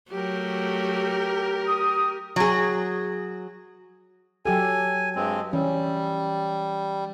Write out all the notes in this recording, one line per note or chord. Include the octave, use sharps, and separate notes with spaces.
F#3 A3 G4 A#4
D#6
F#3 G#4
F#3 G4 A4 G#5
G2 G#3 C4
E3 G3 C#4